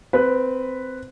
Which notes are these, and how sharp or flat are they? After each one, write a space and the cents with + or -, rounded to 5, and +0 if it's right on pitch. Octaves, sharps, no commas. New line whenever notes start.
C4 -15 B4 +0